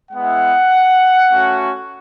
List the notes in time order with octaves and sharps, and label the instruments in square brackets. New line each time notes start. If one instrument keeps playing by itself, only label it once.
[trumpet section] G#3 B3 E4 F#5
A3 C#4 F#4